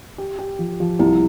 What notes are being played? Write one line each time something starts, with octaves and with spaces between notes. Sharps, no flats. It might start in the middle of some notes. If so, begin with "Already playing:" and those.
G4
G4
F3
F3
C2 E4